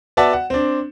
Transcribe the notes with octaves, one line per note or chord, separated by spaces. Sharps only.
B3 F#4 D5 E5 F#5 A5
F#5
C4 D4